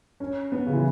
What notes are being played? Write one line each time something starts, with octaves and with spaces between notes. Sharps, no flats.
C#4
B3
C#3
E3